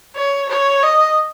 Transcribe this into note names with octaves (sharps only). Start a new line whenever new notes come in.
C#5
C#5
D#5